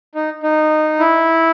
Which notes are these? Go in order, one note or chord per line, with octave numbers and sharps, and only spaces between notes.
D#4
D#4
E4